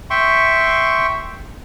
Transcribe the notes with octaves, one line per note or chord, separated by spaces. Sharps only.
E5 G5 C6 C#6